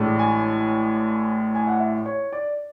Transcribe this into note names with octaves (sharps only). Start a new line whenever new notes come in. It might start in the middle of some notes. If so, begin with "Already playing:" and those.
Already playing: A1 A2 G#3 D4
G#5
G#5
F#5
E5
C#5
D5